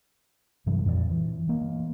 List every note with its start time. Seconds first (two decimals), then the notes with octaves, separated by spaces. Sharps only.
0.66 G2 C3 E3 F#3
0.86 F2 A#2 A#3 D4
1.10 E3
1.48 E3 A#3